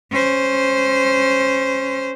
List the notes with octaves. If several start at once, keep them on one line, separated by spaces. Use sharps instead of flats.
C#4 C5